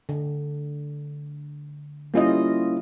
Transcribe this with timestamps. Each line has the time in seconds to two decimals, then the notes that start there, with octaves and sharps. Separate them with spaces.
0.09 D3
2.14 G3 A#3 C#4 E4 F4 D#5